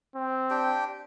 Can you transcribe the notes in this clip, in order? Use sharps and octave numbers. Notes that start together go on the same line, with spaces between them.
C4
D4 G4 G5